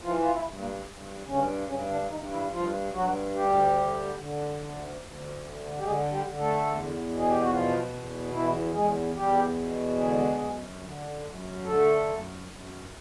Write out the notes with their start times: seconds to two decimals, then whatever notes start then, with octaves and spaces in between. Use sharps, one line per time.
0.03 E3 F3 F4
0.22 F4
0.31 E3 E4
0.44 G2
0.58 A#2 A#3
0.86 G2
1.27 G2 C#3 C#4
1.69 G2 C#3 C#4
1.91 D3 D4
2.10 G2 D#3 D#4
2.31 E3 E4
2.52 G2 F3 F4
2.93 G2 F#3 F#4
3.35 D2 G3 G4
3.77 D3
4.18 D3
4.60 D2
5.01 D2
5.43 D3
5.78 G4
5.83 D3 G#3 G#4
6.12 G3 G4
6.26 D3
6.40 A3 A4
6.66 E2
7.09 B2
7.18 G#4
7.29 G4
7.40 F#4
7.49 B2 F3 F4
7.92 E2
8.32 E2 E3 E4
8.74 E2 G#3 G#4
9.15 E2 G3 G4
9.57 B2
9.98 D3 G#3 G#4
10.40 F#2
10.81 D3
11.23 F#2
11.65 D3 A3 A4
12.06 F#2
12.48 F#2